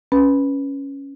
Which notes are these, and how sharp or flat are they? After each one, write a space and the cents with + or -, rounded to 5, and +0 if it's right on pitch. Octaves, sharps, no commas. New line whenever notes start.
C#4 +0 B4 +0